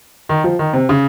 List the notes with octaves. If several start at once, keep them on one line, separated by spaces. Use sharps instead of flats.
D#3
F3
D#3
C3
C#3